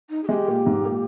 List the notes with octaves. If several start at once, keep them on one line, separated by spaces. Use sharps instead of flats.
D#4
G#4
G#3 G4
A#2
G#2
A#2